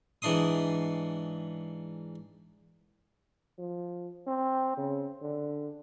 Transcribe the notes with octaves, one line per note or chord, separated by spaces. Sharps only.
G#2 E3 D4 C6 D#6
F3
C4
C#3
D3